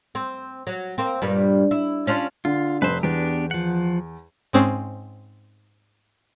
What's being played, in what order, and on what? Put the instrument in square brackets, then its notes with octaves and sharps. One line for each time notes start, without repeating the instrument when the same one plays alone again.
[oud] C4
F#3
A#3 C4
G2 A#2 G3
E4
C#4 D4 F4
[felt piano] D3 [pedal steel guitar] F4
[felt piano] F1 [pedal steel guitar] B4 C5
[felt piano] E2 [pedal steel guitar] B3 D4 G4
[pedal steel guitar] F3 F#5
[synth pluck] G#2 G#3 C4 C#4